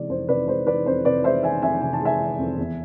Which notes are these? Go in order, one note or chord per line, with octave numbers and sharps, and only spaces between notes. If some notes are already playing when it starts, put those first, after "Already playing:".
Already playing: C3 E3 G#3 D5
F2 C5
C3 B4 D5
G#3 C5
E3 B4 D5
F2 C5
C3 B4 D5
G#3 C5 E5
E3 E5 G#5
F2 E5 G#5
C3 G#5
A5
G#3 E5 G#5
E3
F2
E2